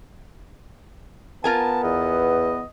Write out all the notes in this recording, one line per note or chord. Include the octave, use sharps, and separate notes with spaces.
B3 F4 A#4 G#5 A5
E2 D#5